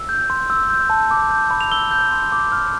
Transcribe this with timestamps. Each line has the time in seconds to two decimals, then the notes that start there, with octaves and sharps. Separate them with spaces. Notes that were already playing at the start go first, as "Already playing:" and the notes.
Already playing: E6
0.09 G6
0.30 C6
0.50 E6
0.70 G6
0.90 A5
1.11 D6
1.31 G6
1.51 B5
1.61 F7
1.72 E6 G7
1.91 G6
2.11 C6
2.32 D6
2.52 F6